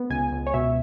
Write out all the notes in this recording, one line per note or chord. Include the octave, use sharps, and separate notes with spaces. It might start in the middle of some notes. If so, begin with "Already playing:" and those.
Already playing: B3
C#2 G#5
C#2
C#5
B2 E5